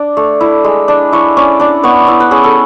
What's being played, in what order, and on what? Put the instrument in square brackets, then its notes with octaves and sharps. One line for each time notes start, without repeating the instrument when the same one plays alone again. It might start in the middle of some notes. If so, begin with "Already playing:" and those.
Already playing: [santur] D4 D5
A3
E4
G#3
D4
E4 C#5
C#4 D5
D4 D5
B3 C#5
E4 D5
B4
C#4 G#4
A4